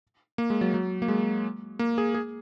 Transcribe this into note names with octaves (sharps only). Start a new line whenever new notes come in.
A#3
G#3
F#3
F#3
A#3
G#3
A#3
G#4
G#4